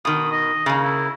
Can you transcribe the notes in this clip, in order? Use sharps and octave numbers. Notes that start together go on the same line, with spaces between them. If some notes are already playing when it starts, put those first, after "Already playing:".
B2 D#3 D#6
D#5
C#3 A#3
E4